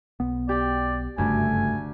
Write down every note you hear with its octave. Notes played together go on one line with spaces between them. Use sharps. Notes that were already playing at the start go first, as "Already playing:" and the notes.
B1 B3
G4 D5 G5
F#1 D2 G2 C#3 A3 G#5